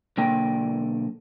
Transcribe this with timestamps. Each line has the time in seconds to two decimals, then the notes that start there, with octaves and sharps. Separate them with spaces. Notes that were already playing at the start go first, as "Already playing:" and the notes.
0.17 B1 D3 A#3 G5